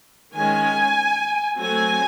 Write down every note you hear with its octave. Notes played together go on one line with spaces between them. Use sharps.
D#3 G#3 C#4 G#5
F#3 A3 C4 G#5